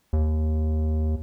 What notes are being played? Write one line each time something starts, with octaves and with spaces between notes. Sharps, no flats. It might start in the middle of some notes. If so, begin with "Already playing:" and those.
D#2